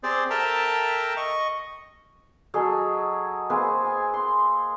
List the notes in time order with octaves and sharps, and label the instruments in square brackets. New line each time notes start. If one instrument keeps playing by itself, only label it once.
[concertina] C4 G4 G#4 C5 D5
A4 A#4 E5 G5 A5 A#5
D#5 C#6
[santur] F#3 G#4 A4 D#5
A#3 C4 G#4 B4
G#5
C6